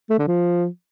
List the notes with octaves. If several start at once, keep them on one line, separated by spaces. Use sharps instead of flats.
A3
D3
F3